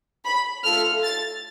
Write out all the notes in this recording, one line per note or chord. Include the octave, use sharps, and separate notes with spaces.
B5
A3 F4 A4 F6
A6